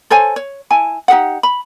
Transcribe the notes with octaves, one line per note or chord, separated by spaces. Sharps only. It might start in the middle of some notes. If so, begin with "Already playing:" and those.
A4 C5 C#5 G#5
C#5
E4 G#5 A5
D#4 G4 G#4 F#5
B5